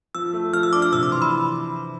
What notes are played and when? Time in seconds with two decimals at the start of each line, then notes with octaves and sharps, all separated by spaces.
0.15 F3 E6
0.33 A3
0.53 F3 F6
0.63 E6
0.73 D4 D6
0.82 F6
0.92 C3 E6
1.03 D6
1.11 E3 C6
1.22 B5